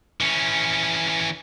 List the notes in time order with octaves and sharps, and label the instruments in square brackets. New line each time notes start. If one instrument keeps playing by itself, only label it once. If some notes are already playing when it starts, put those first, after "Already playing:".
[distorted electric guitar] E3 C#4